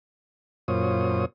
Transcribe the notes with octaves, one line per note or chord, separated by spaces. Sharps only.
F#2 A#2 F4 C5 C#5 D#6